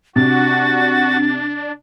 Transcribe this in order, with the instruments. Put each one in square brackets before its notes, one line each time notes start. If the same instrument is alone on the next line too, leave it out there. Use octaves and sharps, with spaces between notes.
[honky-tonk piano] C3 [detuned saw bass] D4 [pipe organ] F#4 [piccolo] A6